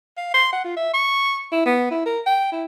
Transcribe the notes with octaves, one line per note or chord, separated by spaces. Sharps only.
F5
C6
F#5
F4
E5
C#6
E4
B3
E4
A#4
G5
E4